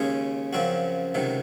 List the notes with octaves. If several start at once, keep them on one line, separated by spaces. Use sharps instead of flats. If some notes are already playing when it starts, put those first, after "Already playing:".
Already playing: D#2 C#3 G#3 C#4 G#4
F#2 C#3 F3 C4 F#4
C#2 C3 D#3 F#3